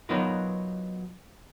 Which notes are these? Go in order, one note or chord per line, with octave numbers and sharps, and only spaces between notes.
F#3 B3 D#4 F4 A#4 B4